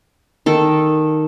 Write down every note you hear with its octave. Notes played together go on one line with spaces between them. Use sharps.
D#3 A4